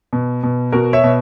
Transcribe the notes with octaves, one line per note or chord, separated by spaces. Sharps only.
B2
B2
B2 F#4 A#4
C#5 E5
B2